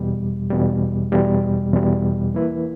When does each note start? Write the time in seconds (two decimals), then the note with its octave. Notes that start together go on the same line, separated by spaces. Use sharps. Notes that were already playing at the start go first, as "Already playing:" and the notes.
Already playing: E2 B2 G3
0.50 E2 B2 G3
1.12 E2 B2 G3
1.73 E2 B2 G3
2.34 E3 A#3 E4 B4